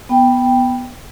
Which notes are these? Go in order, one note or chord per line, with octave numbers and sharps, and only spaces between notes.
B3 G5